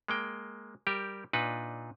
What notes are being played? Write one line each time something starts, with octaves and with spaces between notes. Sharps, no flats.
G#3 A#3 G5
G3 G4 A#4
A#2 D4 D#4 B4